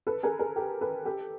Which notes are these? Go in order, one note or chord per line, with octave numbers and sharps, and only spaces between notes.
A4 B4
G#4 A#4
G#4 A#4
G4 A4
A4 B4
G4 A4